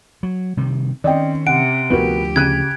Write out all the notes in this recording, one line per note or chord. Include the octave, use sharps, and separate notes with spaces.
F#3
C3 D#3 G3
D#3 C4 C#4 D5 D#5 G5
C3 F#5 D7
D2 F3 B3 F#4 G4 A#4
C#3 F#6 G#6 D#7